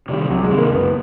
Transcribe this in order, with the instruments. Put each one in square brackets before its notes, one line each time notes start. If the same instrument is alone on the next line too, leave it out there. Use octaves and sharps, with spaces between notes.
[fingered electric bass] C3 D#3 [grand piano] G3
[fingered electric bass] C2 [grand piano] F#3
[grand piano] G#3
[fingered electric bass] C3 D#3
[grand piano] A#3
[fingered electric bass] F#1 [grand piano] B3